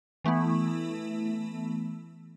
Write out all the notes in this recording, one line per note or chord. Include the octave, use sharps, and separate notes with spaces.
E3 A3 B3 E4